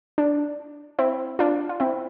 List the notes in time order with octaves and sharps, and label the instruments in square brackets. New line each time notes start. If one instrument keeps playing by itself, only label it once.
[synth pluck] D4
C4 E4
D4 F4
F4
C4 E4